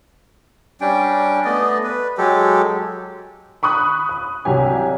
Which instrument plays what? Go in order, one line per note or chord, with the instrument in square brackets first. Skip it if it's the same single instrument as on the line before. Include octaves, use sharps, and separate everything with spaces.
[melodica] G3 C#4 D4 G5
A3 B3 D5 D#5
B4
F#3 G#3 G4 A4
[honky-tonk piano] B5 C#6 D#6 F#6
D#6
C2 F#3 G4 G#5